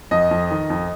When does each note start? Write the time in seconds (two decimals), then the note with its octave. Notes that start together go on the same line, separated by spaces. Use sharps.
0.11 F2 D#5
0.31 F2
0.51 D#3
0.70 F2